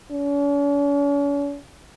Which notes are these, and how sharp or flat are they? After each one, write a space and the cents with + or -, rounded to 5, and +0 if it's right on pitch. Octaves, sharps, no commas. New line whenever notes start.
C#4 +45